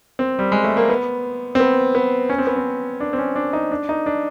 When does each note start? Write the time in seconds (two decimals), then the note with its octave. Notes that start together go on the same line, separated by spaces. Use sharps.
0.19 C4
0.39 G3
0.52 G#3
0.64 A3
0.77 A#3
0.89 B3
1.55 C4
1.60 B3
1.95 B3
2.30 C#4
2.38 C4
2.47 B3
2.56 C4
3.00 D4
3.13 C4
3.18 C#4
3.36 D4
3.53 D#4
3.71 D4
3.89 D#4
4.06 D4